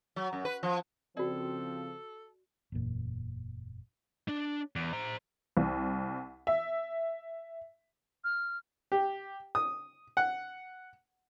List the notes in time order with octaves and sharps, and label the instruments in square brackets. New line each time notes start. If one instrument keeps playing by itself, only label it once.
[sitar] F#3
F#2
B4
F3
[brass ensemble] C#3 F3 C4 [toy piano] F#4 D5 [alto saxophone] A4
[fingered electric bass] F#1 E2 A#2
[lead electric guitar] D4
E2
C5 A#5
[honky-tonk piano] C2
E5
[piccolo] F6
[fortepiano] G4
D#6
F#5